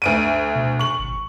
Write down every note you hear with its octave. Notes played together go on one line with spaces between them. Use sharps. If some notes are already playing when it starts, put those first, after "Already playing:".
D2 D7 D#7
B2
C#6 F#7
G#1